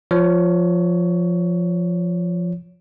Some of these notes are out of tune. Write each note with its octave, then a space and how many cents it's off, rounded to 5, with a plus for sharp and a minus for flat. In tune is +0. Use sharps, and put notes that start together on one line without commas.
F3 +0 C#5 +20